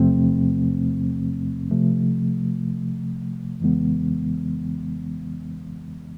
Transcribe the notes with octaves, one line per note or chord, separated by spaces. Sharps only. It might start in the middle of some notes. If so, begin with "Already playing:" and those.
Already playing: E2 C3 F3 A3 C4
C3 F3 A3
F2 C#3 E3 G#3 B3